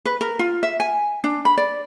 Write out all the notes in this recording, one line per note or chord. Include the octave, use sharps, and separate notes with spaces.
B4
A#4
F4
E5
G#5
D4
B5
D5